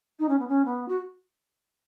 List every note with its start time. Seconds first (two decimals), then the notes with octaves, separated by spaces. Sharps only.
0.19 D#4
0.28 C#4
0.39 B3
0.48 C#4
0.65 B3
0.88 F#4